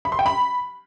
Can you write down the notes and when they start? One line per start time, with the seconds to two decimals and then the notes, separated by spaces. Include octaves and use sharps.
0.05 B5
0.12 C6
0.19 G5
0.26 B5